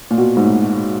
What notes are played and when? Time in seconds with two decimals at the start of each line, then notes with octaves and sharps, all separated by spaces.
0.11 A#2
0.18 B2
0.37 G#2
0.44 A2